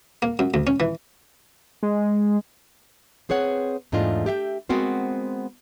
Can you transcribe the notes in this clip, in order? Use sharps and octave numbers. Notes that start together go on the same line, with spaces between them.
A#3
F#2
D2
C#4
E3
G#3
C4 G#4 B4 C#5 F#5
E2 G#2 A3 D4 F4 D#5
G4 E5 F5 G5
G#3 B3 C4 F#4 A#4 C5